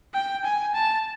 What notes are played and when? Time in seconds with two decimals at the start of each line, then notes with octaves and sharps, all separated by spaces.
0.14 G5
0.44 G#5
0.74 A5